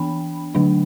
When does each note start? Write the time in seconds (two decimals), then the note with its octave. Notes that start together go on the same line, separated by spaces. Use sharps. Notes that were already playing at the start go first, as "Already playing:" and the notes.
Already playing: E3 B3 D4 G5 B5
0.55 D3 F#3 A3 D4